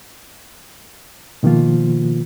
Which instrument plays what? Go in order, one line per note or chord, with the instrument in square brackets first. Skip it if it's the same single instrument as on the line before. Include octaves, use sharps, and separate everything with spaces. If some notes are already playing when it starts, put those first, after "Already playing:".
[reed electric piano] B2 D#3 F3 A#3 F4